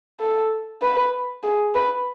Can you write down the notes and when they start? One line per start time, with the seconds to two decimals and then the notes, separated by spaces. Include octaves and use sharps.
0.20 A4
0.82 B4
1.43 G#4
1.75 B4